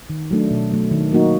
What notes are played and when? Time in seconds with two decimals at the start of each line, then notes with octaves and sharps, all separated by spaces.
0.10 D#3
0.31 F#3 A3 D4
0.51 B2
0.71 F#3 A3
0.91 D#3
1.12 F#3 A#3 D#4 F#4